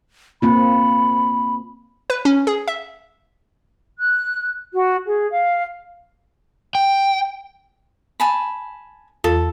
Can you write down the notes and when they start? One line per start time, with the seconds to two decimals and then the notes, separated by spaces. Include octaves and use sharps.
0.42 A#3 C4 F4 B5
2.10 B4
2.25 C#4
2.47 G#4
2.68 E5
3.98 F#6
4.73 F#4
5.05 G#4
5.30 F5
6.75 G5
8.20 G#5 A5 B5
9.24 E2 F4 A4